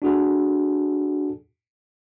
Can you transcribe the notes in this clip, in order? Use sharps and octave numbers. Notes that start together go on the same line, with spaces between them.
D4 F#4 G#4 A4